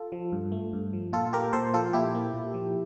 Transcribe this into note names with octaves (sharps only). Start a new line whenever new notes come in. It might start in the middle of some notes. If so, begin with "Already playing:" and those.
Already playing: F4 A4
F3
G2
A3
G2
F3
A#2 F4 A4
A#3 G4 A#4
A#2 A4 C5
F3 F4 A4
A#2 E4 G4
A#3
A#2
F3